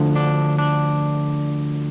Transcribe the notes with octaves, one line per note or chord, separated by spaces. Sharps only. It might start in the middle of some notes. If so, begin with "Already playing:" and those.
Already playing: D2 D3 F3
D4
D4